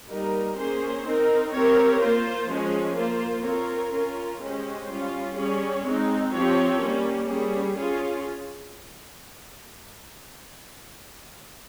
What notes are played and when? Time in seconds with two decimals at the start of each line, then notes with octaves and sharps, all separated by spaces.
0.09 G3 A#3 D#4 A#4
0.57 A#3 C#4 G#4 C5
1.05 C4 D#4 A#4
1.53 C4 G4 A#4 C#5
2.01 A#3 F4 C5
2.48 F3 G#3 C#4 G#4
2.97 A#3 F4 C5
3.45 C4 F4 A#4 C#5
3.93 C#4 F4 A#4
4.41 G#3 C#4 G4 C5
4.88 G3 C#4 F4
5.37 G3 C#4 G#4 C#5
5.84 G#3 C4 D#4
6.32 F3 C4 G4 C#5
6.80 G3 A#3 C#4
7.29 G3 C#4 G#4
7.76 C#4 F4 G#4